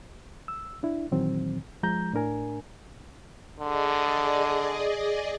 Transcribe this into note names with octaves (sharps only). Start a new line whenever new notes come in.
E6
D4 E4
A#2 D#3 E3 F#3 C4
F3 G#3 A#5 G6
A2 D4 A#4 G#5
D3 G#4 D5 D#5